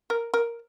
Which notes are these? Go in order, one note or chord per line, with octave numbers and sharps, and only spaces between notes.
A#4
A#4